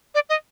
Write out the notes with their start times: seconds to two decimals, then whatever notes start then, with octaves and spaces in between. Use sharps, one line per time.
0.15 D5
0.29 D#5